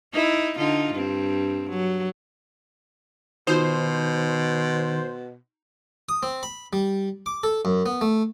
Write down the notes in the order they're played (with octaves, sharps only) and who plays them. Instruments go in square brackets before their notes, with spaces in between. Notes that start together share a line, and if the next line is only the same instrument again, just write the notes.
[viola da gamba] D#4 E4
D3 D#4 F4
G2 C4
F#3
[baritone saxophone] B2 [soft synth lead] D#3 [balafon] D#4 F4 F#4 [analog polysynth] C5
[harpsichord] D#6
C4
B5
G3
D6
A4
F#2
B3
A3